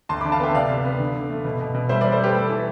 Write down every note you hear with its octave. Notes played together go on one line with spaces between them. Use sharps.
D2 A5 C6
B5 D6
D3
F5 A5
B3 E5 G5
C3 D5 F5
C3
B3
D3
D3
A3
B2
B2
B2
G3 C5 E5
B4 D5
G3
A4 C5
G3 G4 B4
A3 A4
E3